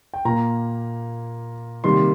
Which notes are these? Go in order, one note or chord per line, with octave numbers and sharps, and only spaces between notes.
G5
A#2 A#3 A#5
C3 D#3 G3 A#3 C6